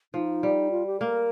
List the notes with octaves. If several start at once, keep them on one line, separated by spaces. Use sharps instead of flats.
F3 D#4
G3
F4
G4
A#3 A#4